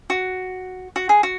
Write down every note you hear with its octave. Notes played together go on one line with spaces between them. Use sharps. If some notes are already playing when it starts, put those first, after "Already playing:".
F#4
F#4
G#4
F#4